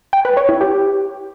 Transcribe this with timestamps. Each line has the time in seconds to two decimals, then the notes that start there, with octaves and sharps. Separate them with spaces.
0.13 G5
0.25 B4
0.37 C#5
0.49 E4
0.61 G4